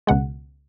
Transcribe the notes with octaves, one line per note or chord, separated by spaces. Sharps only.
C#2 B2 G#3 F#5